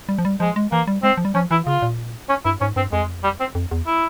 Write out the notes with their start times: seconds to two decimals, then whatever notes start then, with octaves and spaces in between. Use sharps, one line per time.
0.09 G3
0.18 F3
0.25 G3
0.40 F3 G#3
0.56 G#3
0.72 E3 A#3
0.87 G3
1.03 G#3 C4
1.17 F3
1.25 G3
1.35 F3 C#4
1.51 E3 E4
1.66 C#3 F4
1.82 A#2
2.29 C#4
2.45 G2 E4
2.61 G#2 C#4
2.76 G2 C4
2.92 F2 G#3
3.24 G3
3.40 C4
3.55 F2
3.71 E2
3.87 E4